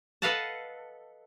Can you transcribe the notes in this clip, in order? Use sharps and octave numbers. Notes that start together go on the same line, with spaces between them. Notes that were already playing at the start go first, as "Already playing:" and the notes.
A4 B4 D#5 F5 F#5 A5